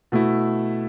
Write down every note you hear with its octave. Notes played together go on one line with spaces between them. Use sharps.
B2 A3 E4